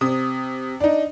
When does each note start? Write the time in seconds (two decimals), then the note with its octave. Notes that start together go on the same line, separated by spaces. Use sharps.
0.01 C3 D#6
0.80 D4 D#4